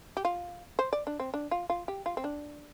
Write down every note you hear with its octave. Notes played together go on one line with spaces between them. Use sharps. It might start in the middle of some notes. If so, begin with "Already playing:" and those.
G4
F4
C5
D5
D4
C4
D4
F4
F4
G4
F4
C4
D4